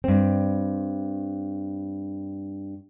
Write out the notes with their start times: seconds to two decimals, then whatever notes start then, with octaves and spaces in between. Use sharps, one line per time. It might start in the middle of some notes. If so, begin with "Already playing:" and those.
0.04 G2 C4